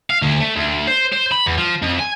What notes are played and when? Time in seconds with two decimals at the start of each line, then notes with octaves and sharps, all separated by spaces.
0.10 F5
0.22 D2
0.40 A3
0.55 D2
0.88 C5
1.13 C5
1.32 B5
1.46 E2
1.58 F3
1.82 F2
1.99 G#5